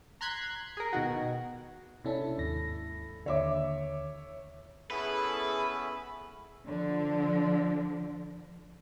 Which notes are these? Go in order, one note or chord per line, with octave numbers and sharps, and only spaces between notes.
A#5 C6 F#6 G#6 B6
G#4 A#4
B2 D#3 F#4
C3 C#4 D4 E4 A4
D#2 G#2 A#6
D#2 D3 C#5 E5 D6
B3 C#4 E4 G#4 A4 B4 E5
D3 F3